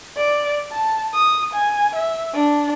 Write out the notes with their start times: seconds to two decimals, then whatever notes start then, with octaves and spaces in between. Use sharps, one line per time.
0.16 D5
0.71 A5
1.14 D#6
1.53 G#5
1.95 E5
2.34 D4